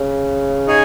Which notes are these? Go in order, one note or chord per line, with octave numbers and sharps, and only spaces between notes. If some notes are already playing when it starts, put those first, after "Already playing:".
Already playing: C#3
D#4 G#4 C#5 G#5